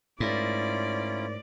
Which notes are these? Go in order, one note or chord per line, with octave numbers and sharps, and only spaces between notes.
G#2 A3 C#4 E4 F4 A#4 D5